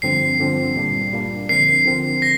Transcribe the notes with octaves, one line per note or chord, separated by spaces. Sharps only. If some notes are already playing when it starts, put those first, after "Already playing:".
G2 D3 F3 C4 C7
G2 D3 F3 C4
A#2 G3 A#3 D4
A#2 G3 A#3 D4
D3 F3 C4 A#4 C7
D3 F3 C4 A#4
A#6